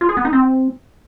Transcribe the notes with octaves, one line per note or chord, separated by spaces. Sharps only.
F4
G#4
B3
D#4
C4